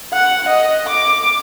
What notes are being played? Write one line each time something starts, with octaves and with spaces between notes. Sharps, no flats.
F#5
D#5
D6